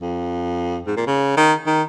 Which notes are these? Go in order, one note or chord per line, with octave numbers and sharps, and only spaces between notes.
F2
G#2
A#2
C#3
D#3
D#3